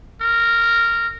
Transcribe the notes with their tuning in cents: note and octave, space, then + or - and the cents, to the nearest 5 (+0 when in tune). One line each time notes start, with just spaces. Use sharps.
A#4 -10